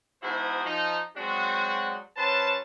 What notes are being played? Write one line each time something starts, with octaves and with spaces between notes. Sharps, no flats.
G#2 B2 E4 F#4 G#4 C5
F3 D#4
F#3 G#3 C4 D4 F#4
F#3 C#4 B4 C5 A5